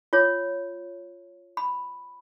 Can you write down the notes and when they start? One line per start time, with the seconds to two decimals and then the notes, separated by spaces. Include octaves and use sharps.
0.13 F4 C#5
1.57 B5